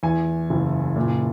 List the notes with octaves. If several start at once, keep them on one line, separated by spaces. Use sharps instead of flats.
E2 G#5
F#1
A#2